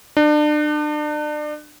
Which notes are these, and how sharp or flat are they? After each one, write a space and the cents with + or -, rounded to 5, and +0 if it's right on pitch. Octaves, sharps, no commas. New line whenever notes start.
D4 +35